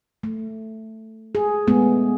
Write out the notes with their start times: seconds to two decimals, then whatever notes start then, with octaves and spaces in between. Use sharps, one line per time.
0.23 A3
1.35 G#4
1.67 G#3 A3 B3 G#4